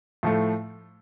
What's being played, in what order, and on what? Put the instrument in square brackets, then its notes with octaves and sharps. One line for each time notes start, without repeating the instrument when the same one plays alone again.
[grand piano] A2 F3 A3